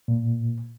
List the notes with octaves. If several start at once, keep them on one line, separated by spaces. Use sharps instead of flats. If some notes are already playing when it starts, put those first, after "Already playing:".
A#2